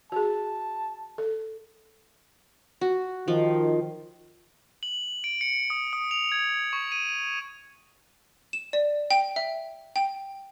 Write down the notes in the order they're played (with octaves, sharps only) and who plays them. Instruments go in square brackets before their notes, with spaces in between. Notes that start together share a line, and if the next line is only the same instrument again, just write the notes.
[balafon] F#4 G#4 [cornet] A5
[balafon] A4
[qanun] F#4
[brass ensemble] D#3 [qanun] F3
[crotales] F#7
D7
C#7
D#6
D#6
F7
G#6
C#6
D#7
[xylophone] E7
D5
G5
E5
G5